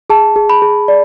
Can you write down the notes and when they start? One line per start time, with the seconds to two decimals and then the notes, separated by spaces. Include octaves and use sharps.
0.10 G#4 A5
0.36 G#4
0.50 B5
0.62 G#4
0.88 D5